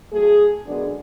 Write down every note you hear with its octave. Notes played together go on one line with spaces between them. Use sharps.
A2 F#3 A3 G#4
F#2 D3 G#3 B3 D4